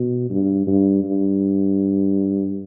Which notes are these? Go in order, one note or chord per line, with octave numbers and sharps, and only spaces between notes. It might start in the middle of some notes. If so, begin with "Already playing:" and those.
Already playing: B2
G2
G2
G2